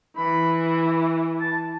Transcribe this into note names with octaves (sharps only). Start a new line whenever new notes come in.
E3 B5
A5